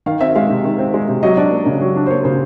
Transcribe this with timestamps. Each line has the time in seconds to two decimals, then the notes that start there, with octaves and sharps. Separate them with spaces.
0.06 D#3 F5
0.21 C4 E5
0.35 G#3 F5
0.50 C3
0.65 D#3
0.79 C4
0.94 G#3
1.08 C3
1.23 F#3 D#5
1.37 D4 D5
1.51 A#3
1.66 C#3
1.81 F#3
1.96 D4
2.06 C5
2.10 A#3 C#5
2.25 C#3 C5